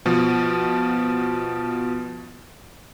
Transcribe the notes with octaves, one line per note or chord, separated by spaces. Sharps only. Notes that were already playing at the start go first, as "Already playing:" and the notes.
B2 F3